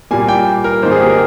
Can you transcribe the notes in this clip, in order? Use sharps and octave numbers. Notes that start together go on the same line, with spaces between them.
A#2 G3 A#3 G#5
G5
A#4
G#2 D#3 A#3 C5
G#4
G4
A#4